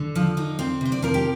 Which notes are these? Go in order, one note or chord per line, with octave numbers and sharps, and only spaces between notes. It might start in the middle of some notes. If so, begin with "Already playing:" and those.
Already playing: D3 A4
F3
D3 D#4
C4 C5
C3 C5
D5
F3 A#4
G4